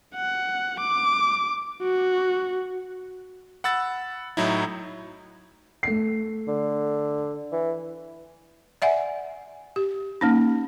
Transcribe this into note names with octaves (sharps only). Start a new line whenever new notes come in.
F#5
D6
F#4
F#5 B5 E6 A6
A2 F#3 D#4 E4
A3 C7
D3
E3
D5 E5 F#5 G#5
G4
A#3 C#4 D#4